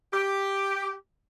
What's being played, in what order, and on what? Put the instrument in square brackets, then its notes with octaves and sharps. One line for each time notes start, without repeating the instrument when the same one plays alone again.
[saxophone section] G4